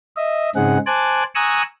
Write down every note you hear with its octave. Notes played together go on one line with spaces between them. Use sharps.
D#5 E5
G#2 C#3 C4 D#4 G#4 F#5
C5 G#5 A5 D6 F#6
G#5 A#5 C#6 D#6 E6 F#6